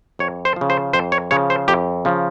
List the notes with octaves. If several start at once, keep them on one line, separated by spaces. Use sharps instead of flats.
F2 C#5
C5
C#3 F3
C5
F2 C5
C#5
C#3 F3 C#5
C5
F2 G4
C#3 F3